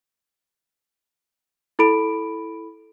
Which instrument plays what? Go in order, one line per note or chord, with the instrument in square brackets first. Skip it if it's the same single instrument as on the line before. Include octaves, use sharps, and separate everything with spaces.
[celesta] E4 A4 B5 D7